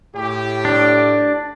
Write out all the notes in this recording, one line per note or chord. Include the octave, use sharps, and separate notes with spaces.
A2 G4
D4